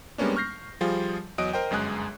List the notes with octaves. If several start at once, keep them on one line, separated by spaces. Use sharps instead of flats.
G3 G#3 A#3 B3 C#4 D4
C#6 F6 G6 A#6 C7
F3 G3 F4 G#4
E2 F#3 D#5 D#6 D7
A#4 C5 D#5 G5
G1 F#2 G#3 G#4 F#6